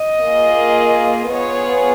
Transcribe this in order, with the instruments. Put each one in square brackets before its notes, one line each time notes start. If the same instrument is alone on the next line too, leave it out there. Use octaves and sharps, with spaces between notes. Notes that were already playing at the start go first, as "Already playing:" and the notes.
Already playing: [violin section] D#5
A#3 F4 G#4
B3 F4 G#4 C#5